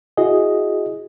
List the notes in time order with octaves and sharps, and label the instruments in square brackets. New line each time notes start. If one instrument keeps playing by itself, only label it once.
[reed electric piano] E4 F#4 G#4 D#5